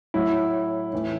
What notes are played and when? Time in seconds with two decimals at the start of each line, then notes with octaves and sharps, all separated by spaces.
0.14 A2 F#3 E4
0.92 A2 E3